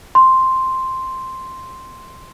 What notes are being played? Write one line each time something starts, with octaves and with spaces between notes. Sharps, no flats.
C6